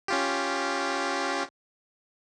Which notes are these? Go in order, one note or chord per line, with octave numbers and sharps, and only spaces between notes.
C#4 F4 G4